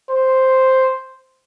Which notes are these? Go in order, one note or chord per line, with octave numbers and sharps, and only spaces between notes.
C5